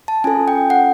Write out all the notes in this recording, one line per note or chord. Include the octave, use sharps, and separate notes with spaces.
A5
C#4 F4 A4 G#5
G5
F#5